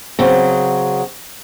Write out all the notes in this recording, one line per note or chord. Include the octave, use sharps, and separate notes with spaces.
C#3 F#3 C4